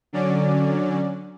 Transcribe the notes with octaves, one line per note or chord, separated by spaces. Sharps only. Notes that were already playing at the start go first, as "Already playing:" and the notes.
D3 F#3 C#4 D5